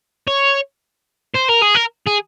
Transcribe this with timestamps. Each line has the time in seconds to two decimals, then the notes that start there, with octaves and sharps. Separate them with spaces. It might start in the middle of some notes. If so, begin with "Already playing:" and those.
0.27 C#5
1.34 C5
1.48 A#4
1.61 G#4
1.75 A#4
2.07 G#4